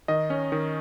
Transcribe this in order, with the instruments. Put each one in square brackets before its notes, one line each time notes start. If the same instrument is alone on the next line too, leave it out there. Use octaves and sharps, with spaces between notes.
[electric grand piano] D#3 D#5
C#4
D#3